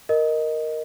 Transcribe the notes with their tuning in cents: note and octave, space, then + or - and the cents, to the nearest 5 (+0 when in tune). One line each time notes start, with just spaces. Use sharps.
A#4 +0 D#5 +0